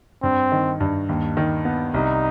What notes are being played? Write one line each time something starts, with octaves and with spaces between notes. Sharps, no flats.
G2 C4
D#3
G2
D#2
D#3
B3
C2 D#4